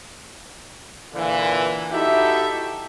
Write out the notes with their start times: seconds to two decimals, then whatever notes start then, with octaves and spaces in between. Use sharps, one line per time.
1.15 A#2 D3 E3
1.93 D#4 E4 F#4 G4 A4 E5